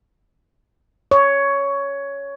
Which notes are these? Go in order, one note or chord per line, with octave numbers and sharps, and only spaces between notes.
C#5